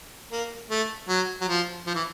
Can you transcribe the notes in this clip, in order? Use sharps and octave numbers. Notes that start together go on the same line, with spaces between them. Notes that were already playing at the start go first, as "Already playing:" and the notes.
A#3
A3
F#3
F#3
F3
F3
E3